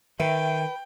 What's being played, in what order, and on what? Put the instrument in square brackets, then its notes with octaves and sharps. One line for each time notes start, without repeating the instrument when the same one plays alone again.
[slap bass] D#3 [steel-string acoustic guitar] B4 [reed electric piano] E5 [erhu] G5